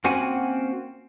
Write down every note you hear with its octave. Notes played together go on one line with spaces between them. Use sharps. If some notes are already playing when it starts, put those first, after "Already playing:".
A#3 C4 C#4 F#4 F#5 G#5